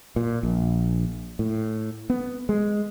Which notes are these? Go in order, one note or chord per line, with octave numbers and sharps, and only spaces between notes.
A#2
A#1
A2
B3
G#3